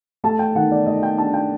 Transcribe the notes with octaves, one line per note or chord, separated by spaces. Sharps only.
A3 A5
G5
D#3 F#5
D5
A3 D#5
G5
D4 A5
G5